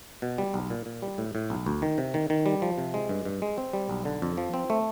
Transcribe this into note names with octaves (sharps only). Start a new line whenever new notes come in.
B2
G3
B1
A#2
A#2
G3
A2
A2
B1
D2
D#3
C3
D#3
D#3
G3
F3
C3
G#3
G2
G2
G#3
C4
G3
B1
D3
F2
F3
C4
A3